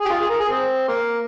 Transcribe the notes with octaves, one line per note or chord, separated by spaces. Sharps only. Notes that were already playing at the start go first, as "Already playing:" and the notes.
G4 G#4
F4
G#4
A#4
G#4
C4
A#3